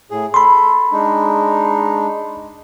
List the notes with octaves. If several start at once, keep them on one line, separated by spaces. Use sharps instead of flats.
A2 G#4
A4 B5 C6
G#3 D4 D#4